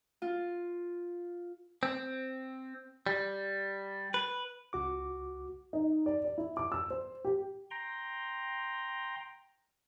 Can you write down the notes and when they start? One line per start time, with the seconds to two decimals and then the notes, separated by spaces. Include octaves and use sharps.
0.22 F4
1.83 C4
3.07 G3
4.14 B4
4.73 C#2 F#4 D6
5.73 D#4
6.06 D5
6.25 D5
6.38 E4
6.57 D6
6.72 E6
6.90 C5
7.25 G4
7.71 G5 A#5 C6